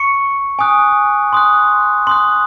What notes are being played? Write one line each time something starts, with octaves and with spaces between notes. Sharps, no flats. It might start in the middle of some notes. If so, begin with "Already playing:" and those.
Already playing: C#6 C#7
G#5 D#6 F#6
C6 D#6 F#6
C6 D#6 F#6